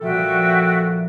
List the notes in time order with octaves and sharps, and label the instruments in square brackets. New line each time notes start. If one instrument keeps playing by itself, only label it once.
[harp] A#1 F3 G3 [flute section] F#4 E5 G5 [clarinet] A4